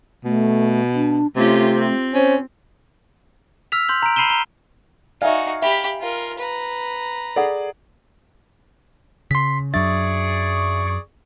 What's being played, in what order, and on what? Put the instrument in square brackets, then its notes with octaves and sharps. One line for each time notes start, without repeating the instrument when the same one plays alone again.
[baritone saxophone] B2 [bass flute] A3
[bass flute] D4
[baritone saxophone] C3 [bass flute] A3 [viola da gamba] C#4 F4 G4
[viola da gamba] C4
[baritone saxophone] C#4 [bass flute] C5
[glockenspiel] E6 F6 B6 F7
C6 G6 F#7
A#5 D7
A#5 B5 C7 D#7 E7 G7
A#5 G7
[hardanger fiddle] D#4 F#4 [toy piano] D5 E5 [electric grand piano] F5 G#5
[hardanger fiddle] G4 B5 [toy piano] E5
[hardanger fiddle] F4 A#4
B4 A#5
[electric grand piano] G#4 D5 [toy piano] A4 F#5
[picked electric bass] C#3 [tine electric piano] C6 B6
[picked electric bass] F#2 F#3 D4 [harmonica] G#4 D5 C#6 [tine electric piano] E5 A6